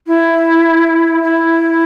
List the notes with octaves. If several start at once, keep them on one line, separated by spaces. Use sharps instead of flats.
E4
E4